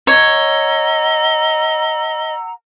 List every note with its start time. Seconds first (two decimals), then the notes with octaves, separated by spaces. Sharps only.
0.07 C#5 D#5 F#5 A#5 E6